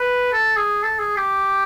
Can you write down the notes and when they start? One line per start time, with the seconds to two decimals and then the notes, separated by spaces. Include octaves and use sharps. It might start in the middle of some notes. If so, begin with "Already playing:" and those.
Already playing: B4
0.32 A4
0.57 G#4
0.83 A4
0.99 G#4
1.17 G4